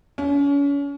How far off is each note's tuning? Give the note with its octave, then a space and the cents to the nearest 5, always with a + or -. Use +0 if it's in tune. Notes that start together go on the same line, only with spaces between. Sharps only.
C#4 +35